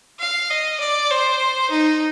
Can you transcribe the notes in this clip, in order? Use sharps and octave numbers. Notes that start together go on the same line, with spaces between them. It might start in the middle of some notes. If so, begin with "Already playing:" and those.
F5
D#5
D5
C5
D#4